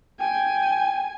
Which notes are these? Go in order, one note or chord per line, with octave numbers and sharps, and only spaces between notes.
G5 G#5